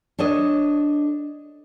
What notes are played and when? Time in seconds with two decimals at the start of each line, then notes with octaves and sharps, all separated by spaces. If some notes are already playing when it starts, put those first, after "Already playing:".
0.18 D4 A4 C#5 D#5